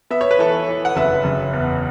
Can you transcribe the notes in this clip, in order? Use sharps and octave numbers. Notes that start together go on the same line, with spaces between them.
B3 E5
C#5
B4
E3 A4 C#5
E3
F#5
F#1 B4 E5
F#1
E2